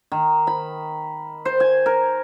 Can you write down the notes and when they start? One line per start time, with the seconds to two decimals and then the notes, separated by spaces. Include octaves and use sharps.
0.12 D#3
0.47 B5
1.45 C5
1.60 G#5
1.86 A#4